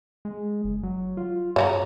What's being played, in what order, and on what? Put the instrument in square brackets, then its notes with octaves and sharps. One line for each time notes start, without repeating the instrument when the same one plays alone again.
[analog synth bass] G#3
F#1
F#3
F4
[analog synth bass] G2 [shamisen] C#3 F#4 A#5